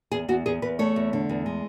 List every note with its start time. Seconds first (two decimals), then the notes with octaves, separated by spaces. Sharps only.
0.12 E2 G#4
0.29 E2 F#4
0.46 E2 G#4
0.62 E2 B4
0.79 A3 C#5
0.96 E2
1.13 D3
1.30 E2
1.46 G#3